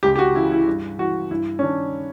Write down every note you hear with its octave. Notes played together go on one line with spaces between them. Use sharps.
C#2 G4
G4
F#4
C#3 E3 E4
E4
G2
E3 F#4
G2 E4
C#4
D#3 D4